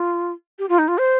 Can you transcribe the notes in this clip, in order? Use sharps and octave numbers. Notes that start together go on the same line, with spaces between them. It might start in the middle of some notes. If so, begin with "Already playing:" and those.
Already playing: F4
G4
F4
D#4
F4
C5